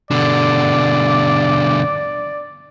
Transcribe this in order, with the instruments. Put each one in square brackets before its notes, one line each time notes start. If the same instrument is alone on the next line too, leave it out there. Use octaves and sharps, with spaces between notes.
[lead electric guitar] B2 D3 [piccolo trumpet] D5